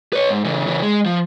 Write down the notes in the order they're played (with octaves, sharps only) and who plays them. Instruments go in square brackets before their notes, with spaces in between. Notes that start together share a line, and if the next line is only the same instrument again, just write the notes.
[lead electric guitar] B4 C#5
G#2
C#3 E3
C#3 E3
G#3
F3